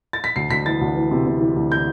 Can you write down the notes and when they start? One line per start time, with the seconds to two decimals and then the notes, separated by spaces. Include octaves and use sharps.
0.13 A6
0.24 B6
0.36 D2 C7
0.50 D2 B6
0.66 E3 A6
0.81 D2
0.95 E3
1.11 C3
1.26 C3
1.41 E3
1.56 D2
1.72 G6